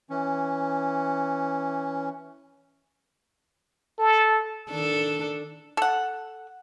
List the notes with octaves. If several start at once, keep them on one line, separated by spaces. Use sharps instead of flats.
E3 C#4
A4
D#3 D4 A4
A4 F#5